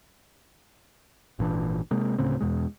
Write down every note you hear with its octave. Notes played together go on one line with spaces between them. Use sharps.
G#1 A#2 E3 D4
C3 G#3 A#3
D2 A2 C#3 C4
E2 B2 G#3